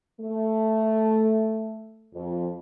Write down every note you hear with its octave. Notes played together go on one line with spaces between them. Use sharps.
A3
F2